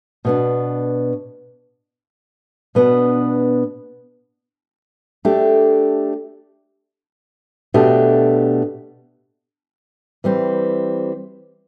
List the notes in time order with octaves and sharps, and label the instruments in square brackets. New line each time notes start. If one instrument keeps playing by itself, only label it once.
[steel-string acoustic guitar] B2 B3 D4
B2 B3 D4
A3 D4 G4
B2 A3 D4 G4
E3 G3 C4